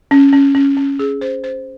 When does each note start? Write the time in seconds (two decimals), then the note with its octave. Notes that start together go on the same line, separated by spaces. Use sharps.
0.11 C#4
0.33 C#4
0.55 C#4
0.77 C#4
0.99 G#4
1.21 C5
1.44 C5